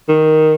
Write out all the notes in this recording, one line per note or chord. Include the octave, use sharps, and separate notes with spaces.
D#3